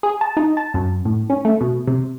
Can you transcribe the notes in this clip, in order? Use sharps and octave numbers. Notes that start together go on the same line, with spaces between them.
G#4
A5
D#4
A5
F#2
A2
C#4
A3
B2
C3